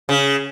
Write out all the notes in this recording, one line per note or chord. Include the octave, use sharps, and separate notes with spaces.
C#3